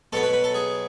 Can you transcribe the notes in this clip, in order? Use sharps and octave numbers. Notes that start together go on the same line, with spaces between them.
B2 F#3 B3 A4
B4
B4
A4
G#4